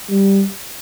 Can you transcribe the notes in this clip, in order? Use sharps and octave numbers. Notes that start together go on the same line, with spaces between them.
G3